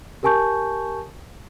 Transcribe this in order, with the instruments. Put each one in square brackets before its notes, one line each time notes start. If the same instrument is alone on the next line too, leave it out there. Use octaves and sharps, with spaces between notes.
[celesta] G4 A#4 G#5 A5 C#6 G6